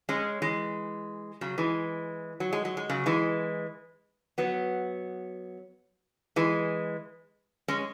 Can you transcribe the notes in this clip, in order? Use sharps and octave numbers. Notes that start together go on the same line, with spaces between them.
G#3 C#4
E3 G#3
C#3 F#3
E3 G#3
F#3
G#3
F#3
G#3
C#3 F#3
E3 G#3
F#3 B3
E3 G#3
G#3 C#4